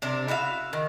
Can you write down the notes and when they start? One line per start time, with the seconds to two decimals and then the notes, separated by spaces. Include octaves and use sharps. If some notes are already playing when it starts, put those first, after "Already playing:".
0.02 C3 D4 A#4
0.28 E4 F#4 E5 F5
0.73 D#3